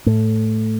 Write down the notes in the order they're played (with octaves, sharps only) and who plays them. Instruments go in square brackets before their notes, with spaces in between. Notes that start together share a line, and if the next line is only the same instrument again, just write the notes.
[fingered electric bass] A2 A3